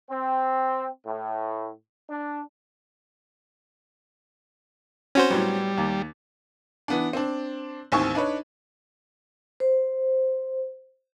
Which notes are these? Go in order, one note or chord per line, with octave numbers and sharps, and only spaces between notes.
C4
A2
D4
C4 C#4 F#4 C5
A2 F#3 G3 B3
D#2
E3 B3 D4
C4 D4
A1 D#2 C4 G#5 C#6
D4 D#4 B4 C#5
C5